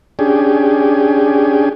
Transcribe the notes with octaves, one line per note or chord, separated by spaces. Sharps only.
C#4 D4 G4 G#4